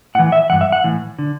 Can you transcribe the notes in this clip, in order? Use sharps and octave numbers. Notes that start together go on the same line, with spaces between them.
A2 E3 F#5
E5
G2 E3 F#5
E5
F#5
A2 E3
D3